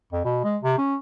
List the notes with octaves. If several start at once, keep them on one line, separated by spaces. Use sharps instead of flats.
F2
B2
G#3
C3
C#4